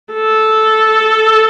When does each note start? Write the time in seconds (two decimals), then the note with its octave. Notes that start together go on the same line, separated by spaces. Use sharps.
0.13 A4